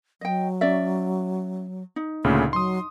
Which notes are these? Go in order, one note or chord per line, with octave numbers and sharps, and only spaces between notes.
F#3 D#5 G5
C#4 D5 E5
D#4
D2 A#2 C#3 A3
F#3 C6 D#6